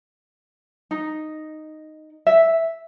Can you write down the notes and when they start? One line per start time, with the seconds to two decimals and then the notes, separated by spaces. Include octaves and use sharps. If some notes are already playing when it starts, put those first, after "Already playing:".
0.91 D#4
2.27 E5